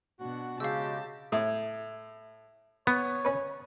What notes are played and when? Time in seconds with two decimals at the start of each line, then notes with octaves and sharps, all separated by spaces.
0.20 B2 D4 F#4 F#5
0.60 C#3 G#3 F#4 G4 F5 A5 E6
1.32 A2
2.87 B3 C#5
3.25 C#4 B4